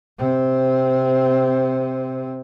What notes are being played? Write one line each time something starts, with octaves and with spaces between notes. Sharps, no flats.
C3 C4